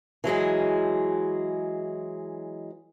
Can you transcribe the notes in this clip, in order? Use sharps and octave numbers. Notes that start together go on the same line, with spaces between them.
E3 F#3 G#3 G#4